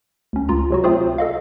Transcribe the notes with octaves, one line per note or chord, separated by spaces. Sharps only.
D2 C#4
C#2 F4 A#5
C3 F#3 F#4
A3 C4 F4 G#4 C5
A4 D#5 F5